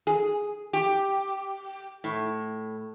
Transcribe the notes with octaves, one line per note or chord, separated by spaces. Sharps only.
G#4
G4
A2